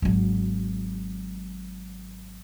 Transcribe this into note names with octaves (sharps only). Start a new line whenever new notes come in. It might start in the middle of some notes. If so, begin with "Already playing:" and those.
G#1 F#3